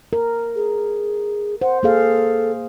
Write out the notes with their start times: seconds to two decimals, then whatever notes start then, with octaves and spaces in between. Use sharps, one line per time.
0.13 A#4
0.55 G#4
1.61 C5 F#5
1.83 A#3 G#4 A4 F5